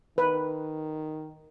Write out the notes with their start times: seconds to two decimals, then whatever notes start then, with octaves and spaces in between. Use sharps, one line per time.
0.18 D#3 B4